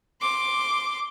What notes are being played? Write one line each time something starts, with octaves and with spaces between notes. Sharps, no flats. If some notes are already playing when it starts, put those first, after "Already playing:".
C6 D6